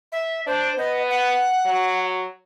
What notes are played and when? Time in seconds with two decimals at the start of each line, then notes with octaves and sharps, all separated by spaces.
0.12 E5
0.47 D4 C5
0.78 B3 D#5
1.10 F#5
1.66 F#3